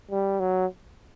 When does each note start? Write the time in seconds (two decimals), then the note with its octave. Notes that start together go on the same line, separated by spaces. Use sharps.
0.11 G3
0.40 F#3